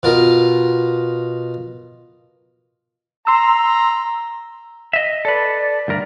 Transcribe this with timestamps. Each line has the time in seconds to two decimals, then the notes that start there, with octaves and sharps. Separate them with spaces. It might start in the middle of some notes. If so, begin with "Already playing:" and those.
0.03 B2 F4 A#4
3.27 A#5 C6 E6
4.93 D#5 E5
5.25 A4 B4 D5
5.88 D2 G2 A#4